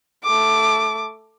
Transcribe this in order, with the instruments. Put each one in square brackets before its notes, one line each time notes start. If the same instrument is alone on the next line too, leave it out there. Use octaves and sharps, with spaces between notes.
[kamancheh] A3 D6